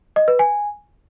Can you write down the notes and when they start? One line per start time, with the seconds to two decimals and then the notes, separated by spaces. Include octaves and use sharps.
0.16 D#5
0.28 B4
0.39 G#5